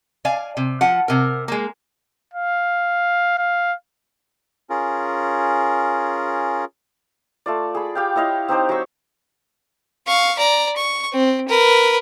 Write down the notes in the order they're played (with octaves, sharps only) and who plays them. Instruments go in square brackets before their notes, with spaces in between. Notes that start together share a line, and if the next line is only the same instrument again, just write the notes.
[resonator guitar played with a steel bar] D5 F5 G#5
C3
F3 F#5
C3 A#4
G#3 A#3
[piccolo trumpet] F5
F5
[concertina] C#4 F4 G#4 A#4
[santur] A3 F4 D5
G#4 B5
G4 F5 G5
E4 C#5 D#5 F5
C4 D#4 G4 C5
F#3 C6 C#6 E6
[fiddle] F5 C#6
D5 A#5
C#6
C4
A#4 B4